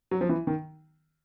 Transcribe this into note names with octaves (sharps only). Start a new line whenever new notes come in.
F#3
F3
E3
D#3